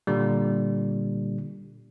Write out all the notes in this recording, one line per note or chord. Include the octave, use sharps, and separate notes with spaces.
A#2 D3 G3